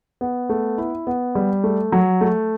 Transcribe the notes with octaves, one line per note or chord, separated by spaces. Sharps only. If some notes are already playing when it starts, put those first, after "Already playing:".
B3
A3
E4
B3
G3
A3
F#3
A3